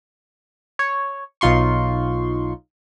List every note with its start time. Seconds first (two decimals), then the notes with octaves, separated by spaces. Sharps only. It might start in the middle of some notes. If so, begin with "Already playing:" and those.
0.79 C#5
1.41 B1 D#4 F4 C6 C#6